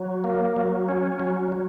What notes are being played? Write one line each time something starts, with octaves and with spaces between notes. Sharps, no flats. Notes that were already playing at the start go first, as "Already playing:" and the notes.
Already playing: F#3
A#3
F#3
C#4
F#3
F#3